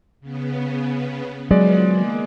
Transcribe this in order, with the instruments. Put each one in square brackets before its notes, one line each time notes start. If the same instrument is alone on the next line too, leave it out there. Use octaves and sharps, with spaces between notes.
[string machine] C#3 B3
[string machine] D#3 F3 B3 [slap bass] F#3 [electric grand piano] G#3 D5
[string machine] A#3